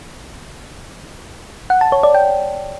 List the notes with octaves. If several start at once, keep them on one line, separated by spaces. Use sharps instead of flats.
F#5
A5
C#5
D5
G5